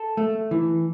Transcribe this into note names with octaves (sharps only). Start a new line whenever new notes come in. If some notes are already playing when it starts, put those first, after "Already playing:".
Already playing: A4
A3
E3